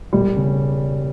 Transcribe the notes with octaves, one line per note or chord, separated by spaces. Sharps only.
E1 G3
C#3